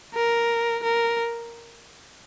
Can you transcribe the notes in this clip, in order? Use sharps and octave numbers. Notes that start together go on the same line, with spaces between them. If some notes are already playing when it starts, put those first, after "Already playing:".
A#4
A#4